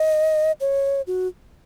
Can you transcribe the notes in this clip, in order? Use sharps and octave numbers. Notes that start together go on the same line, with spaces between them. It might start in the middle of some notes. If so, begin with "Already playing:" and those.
Already playing: D#5
C#5
F#4